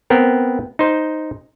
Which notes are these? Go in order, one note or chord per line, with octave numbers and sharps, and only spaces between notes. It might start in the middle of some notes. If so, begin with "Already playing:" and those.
B3 C4 A#4
D#4 C5